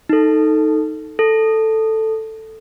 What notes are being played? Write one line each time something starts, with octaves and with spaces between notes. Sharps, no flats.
D#4 A4
A4